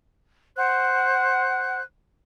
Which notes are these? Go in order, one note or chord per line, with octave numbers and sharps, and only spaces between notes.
C5 F#5 F#6